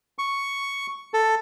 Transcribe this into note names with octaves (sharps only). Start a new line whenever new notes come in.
C#6
A4